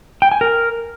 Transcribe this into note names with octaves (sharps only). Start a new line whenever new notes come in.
G5
G#5
A#4